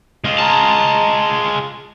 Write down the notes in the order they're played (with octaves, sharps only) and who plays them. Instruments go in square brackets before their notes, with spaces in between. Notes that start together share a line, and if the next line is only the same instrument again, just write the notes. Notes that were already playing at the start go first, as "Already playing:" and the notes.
[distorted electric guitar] G#3 F4
[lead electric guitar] A5 A#5